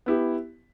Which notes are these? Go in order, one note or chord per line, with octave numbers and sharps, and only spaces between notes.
B3 E4 G4